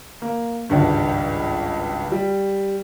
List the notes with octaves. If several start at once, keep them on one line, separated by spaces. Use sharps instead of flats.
A#3
G#1 C#2 G2
G3